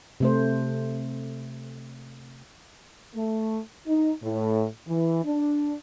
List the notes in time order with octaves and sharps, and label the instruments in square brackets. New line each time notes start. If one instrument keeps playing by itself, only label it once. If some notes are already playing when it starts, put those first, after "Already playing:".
[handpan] C3 A3 C5
[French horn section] A3
D#4
A2
E3
D4